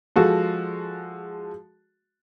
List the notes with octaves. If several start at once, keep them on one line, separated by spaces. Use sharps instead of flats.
F3 G#3 F#4 A4